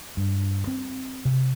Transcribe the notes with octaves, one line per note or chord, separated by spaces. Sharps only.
G2
C4
C3